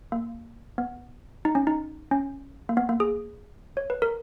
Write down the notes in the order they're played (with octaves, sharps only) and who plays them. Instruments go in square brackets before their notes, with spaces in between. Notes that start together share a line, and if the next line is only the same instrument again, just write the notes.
[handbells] A#3
B3
D#4
C#4
D#4
C#4
A#3
B3
A#3
G#4
C#5
B4
A#4